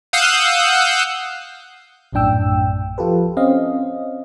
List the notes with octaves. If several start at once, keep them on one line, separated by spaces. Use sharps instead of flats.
F5 F#5 D#6 E6 F#6 G6
A#1 F#2 A2 D4 G5 E6
F3 F4 G4 A4 B4
C4 C#4 D#5 F5